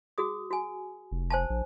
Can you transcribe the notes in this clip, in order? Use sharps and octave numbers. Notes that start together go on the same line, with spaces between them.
F#4 G#4 D#6
F#4 G#5
F1
C5 G#5 A5
A#1